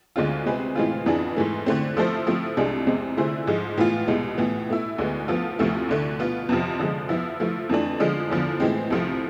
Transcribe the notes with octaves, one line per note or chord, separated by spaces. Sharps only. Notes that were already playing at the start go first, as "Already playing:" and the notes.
D2 D3 G#3 C4 F4
C3 G#3 C4 G#4 B4
A2 E3 G#3 C4 F4
F2 E3 B3 D4 G#4
G#2 E3 A3
D3 A3 C4
F3 A3 E4 A4 C5
F3 A3 C4 E4
C2 C3 G#3 D4 G#4
E2 C3 G#3 C4
D3 A3 E4 G#4 C5
G#2 F3 G#3
A2 E3 B3 F4
C2 B2 G#3
A2 E3 B3
B2 A3 E4
D2 D3 G#3 B3
F3 B3 F4 A4
D2 C3 F3 A3 E4
D2 D3 A3
B2 B3 F4
F2 C3 F3
D3 F3 G#3
F3 B3 E4
F3 A3 E4
F2 E3 A3 D4
D3 F3 G#3 D4
E2 D3 F3
A2 E3 G#3 C4
C2 C3 F3 A3